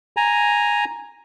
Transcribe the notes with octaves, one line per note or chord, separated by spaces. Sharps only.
G#5 A#5